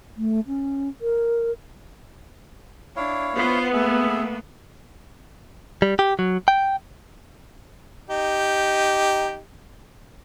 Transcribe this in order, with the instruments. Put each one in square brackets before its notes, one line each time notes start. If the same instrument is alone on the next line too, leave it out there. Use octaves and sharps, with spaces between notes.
[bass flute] A3
C#4
A#4
[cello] D4 [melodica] E4 C#5 F5
[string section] B3 [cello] F4 C5
[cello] A3 A#3 [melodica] G#4 E5
[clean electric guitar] G3
G4
F#3
G5
[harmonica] D#4 G4